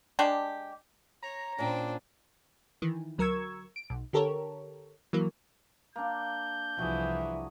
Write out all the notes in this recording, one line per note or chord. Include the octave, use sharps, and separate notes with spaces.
G#3 D4 G4
C#5 A#5
A#2 C#4 D4 C5 G5
D#3 E3
D2 F#3 A#4 C#6 E6 G#6
D7
B1
D3 G4 A4 A#4 C#5
E3 F#3 A#3
A#3 D4 G6
C2 E3 F3 F#4 G#4